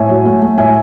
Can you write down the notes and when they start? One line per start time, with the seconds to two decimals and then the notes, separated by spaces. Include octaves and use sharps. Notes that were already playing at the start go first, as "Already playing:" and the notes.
Already playing: A2 E5 G#5
0.09 F#3
0.25 A3
0.42 A3
0.58 A2 E5 G#5